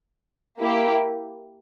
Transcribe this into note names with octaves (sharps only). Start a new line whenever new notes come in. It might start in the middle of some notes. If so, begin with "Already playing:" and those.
A#3 E4 G4